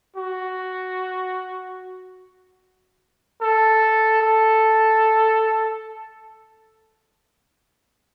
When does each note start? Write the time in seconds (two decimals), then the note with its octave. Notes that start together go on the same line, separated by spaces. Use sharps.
0.16 F#4
3.41 A4
4.22 A4